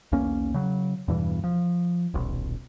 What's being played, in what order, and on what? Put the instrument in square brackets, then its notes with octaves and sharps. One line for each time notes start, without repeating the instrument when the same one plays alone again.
[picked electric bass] B1 E2 A#3 C#4
C#3 F#3
E2 G2 B2 E3
F3
D#1 B1